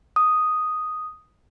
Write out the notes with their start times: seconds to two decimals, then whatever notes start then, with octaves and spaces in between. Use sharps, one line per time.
0.16 D#6